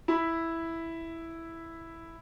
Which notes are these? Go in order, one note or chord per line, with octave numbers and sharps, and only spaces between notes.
E4 B5